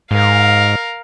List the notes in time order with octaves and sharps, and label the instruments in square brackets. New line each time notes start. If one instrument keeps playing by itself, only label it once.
[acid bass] G#2 [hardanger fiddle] A#4 F5